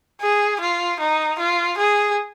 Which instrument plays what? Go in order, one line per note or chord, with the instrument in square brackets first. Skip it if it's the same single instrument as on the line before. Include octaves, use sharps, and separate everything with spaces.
[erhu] G#4
F4
D#4
F4
G#4